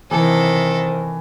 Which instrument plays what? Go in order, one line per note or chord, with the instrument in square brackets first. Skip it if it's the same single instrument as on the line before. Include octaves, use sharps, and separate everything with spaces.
[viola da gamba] C3 D#3 [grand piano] E3 [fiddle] A4 [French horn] C5